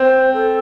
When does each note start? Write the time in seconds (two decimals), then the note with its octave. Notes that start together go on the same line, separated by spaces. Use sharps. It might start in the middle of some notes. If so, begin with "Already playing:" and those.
Already playing: C4 C5
0.34 A4